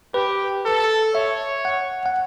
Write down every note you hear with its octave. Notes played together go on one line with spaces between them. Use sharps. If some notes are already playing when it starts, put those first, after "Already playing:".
G4 B4
A4
C#5 E5
F#5
F#5